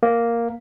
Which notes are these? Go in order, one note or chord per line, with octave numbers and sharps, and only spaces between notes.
A#3